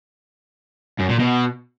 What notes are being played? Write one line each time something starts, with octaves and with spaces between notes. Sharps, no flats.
F#2
A#2
B2